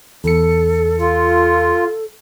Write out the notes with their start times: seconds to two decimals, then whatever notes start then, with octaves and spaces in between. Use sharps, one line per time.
0.24 E2 A4 C#7
0.99 F4 A4